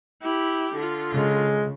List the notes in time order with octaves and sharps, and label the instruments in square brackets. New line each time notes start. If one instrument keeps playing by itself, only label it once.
[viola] E4 G4
D3 F4
[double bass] C#3 [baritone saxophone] G#3